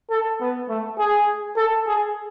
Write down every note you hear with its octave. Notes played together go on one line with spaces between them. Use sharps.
A4
B3
A3
G#4
A4
G#4